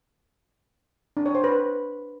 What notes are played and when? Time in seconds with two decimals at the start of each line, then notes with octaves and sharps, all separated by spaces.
1.17 D4
1.26 C#5
1.35 C5
1.44 B4